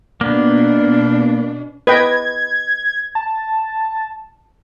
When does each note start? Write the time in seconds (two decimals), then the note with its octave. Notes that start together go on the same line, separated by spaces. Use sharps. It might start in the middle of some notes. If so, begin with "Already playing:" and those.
0.21 B2 A#3 B3 D4
1.87 B4 D#5 G5 G#6
3.15 A5